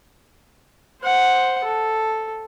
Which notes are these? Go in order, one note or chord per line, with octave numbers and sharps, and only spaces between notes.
C5 F#5
A4